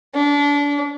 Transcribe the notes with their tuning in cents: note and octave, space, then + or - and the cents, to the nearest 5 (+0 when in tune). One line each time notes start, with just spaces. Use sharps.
D4 -30